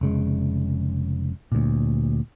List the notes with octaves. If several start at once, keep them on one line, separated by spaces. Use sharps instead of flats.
F1 C#3 G#3
D2 A#2